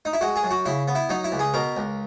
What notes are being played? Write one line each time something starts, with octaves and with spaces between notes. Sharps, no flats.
D#4
E4
G#3 F#4
G#4
F#2
F#4
C#3 E4
B3
E4
F#3 D#4
E4
C#2
G#4
B2 A#4
C#2